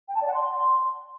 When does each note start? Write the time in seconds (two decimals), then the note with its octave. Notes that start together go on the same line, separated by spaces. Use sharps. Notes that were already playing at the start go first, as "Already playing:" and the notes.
0.08 G5
0.14 A5
0.21 D5
0.27 F#5
0.33 C6